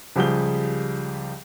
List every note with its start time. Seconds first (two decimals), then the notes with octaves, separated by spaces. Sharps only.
0.16 C#2 F3 G3 G4 G#4 G7